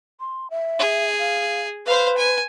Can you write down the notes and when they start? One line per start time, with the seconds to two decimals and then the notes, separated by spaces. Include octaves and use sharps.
0.20 C6
0.50 E5
0.79 G#4
1.19 F5
1.87 B4 C5 F5
2.17 G#5